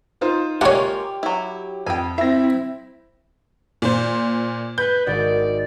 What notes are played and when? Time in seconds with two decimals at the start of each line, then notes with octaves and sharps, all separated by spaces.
0.21 D#4 F4 C5
0.61 G#3 A#3 F4 G4 C#5 F#5
1.23 F#3 E4
1.86 F2 G5 G#5
2.18 C4 E4 E5 A#6
3.82 A#2 C5
4.78 B4 G6
5.06 G#1 F#4 D5 D#5